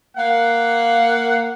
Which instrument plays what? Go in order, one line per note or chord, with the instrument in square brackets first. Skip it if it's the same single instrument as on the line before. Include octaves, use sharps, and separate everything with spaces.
[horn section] A#3 F5 F#5